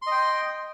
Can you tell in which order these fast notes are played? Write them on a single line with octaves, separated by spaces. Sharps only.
C6 D#5 G5